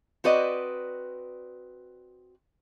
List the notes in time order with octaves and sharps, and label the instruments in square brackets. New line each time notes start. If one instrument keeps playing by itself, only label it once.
[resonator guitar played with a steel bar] C4 F#4 B4 D5 D#5